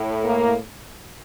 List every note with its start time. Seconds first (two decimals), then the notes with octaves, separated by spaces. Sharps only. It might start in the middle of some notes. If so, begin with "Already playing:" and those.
Already playing: A2
0.24 A#3